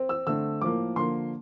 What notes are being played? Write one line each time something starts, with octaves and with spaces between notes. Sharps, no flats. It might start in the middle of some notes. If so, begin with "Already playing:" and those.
Already playing: C4
E6
D3 A3 C4 E6
A2 F3 A#3 D6
D3 F3 A#3 C6